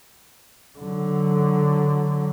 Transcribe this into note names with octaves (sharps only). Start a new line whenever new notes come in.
D3 F#3